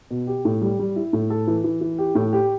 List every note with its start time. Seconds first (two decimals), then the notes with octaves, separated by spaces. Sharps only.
0.11 B2
0.27 G4
0.45 A2
0.62 G3
0.79 G3
0.96 E4
1.13 A2
1.30 A4
1.48 E3
1.64 E3
1.81 E3
1.98 G4
2.15 A2
2.33 G4